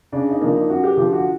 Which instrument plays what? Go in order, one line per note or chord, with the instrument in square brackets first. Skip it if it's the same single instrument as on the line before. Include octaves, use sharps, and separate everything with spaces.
[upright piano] C#3 D4
D#4
F3 A#3 D4
D#4
F#2 F#4
G4
D3 F3 G4
F#4